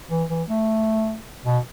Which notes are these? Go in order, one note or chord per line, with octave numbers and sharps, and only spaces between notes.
E3
E3
A3
B2